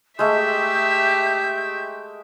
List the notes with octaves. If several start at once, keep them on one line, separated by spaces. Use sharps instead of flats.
G#3 A3 G4 E5 G6